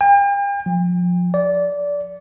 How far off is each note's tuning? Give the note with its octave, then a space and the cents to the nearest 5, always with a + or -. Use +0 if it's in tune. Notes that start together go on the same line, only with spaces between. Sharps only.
G5 +45
F3 +25
D5 -20